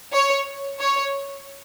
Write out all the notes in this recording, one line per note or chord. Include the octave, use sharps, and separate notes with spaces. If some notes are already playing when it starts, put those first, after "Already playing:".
C#5
C#5